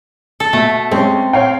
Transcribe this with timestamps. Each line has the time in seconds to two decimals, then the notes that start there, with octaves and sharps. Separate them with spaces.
0.40 A4
0.53 B2 A3 E5
0.91 G#3 C4 C#4
1.33 C#5 F5 G5